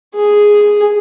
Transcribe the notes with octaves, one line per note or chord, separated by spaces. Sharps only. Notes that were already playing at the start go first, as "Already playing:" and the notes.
G#4